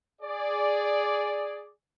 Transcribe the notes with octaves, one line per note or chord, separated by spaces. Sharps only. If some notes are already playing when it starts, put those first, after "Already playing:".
G#4 D5